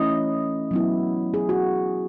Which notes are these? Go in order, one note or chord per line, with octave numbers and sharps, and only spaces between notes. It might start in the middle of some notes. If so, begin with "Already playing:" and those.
Already playing: E3 A3 C#4 E4 D#5
F#3 B3 E4
G#4
F#4